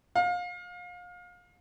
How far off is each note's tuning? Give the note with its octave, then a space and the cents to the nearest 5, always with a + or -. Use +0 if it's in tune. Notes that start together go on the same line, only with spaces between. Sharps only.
F5 +30